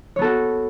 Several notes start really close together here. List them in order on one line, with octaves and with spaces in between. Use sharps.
C#5 B3 A4 F#4